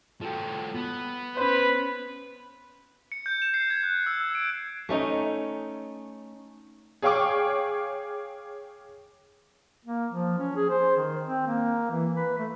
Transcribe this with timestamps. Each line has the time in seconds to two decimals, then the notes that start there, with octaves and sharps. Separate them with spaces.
0.21 F3 F#4 A4 G5
0.75 B3
1.37 C#4 B4 C5
3.12 C#7
3.26 G6
3.42 E7
3.54 C7
3.70 G#6
3.83 F#6
4.06 E6
4.20 E6
4.35 D7
4.89 A3 C#4 D#4
7.02 G#4 C#5 F5 G5 C#6 D6
9.85 A#3
10.12 F3
10.39 C#4
10.56 G#4
10.69 C5
10.97 D#3
11.24 C4
11.47 A#3
11.90 E3
12.16 B4
12.38 A3